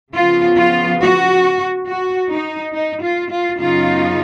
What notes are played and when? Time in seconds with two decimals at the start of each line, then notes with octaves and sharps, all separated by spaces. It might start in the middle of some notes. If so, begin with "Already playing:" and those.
0.15 C#3 F3 B3 F4
0.59 F4
1.01 F#4
1.87 F#4
2.30 D#4
2.73 D#4
3.02 F4
3.30 F4
3.59 F#2 C#3 F#3 B3 D#4 F4